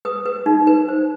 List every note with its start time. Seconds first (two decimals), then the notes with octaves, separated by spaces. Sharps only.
0.05 B4 D#6
0.26 B4
0.46 D#4
0.67 B4
0.88 C5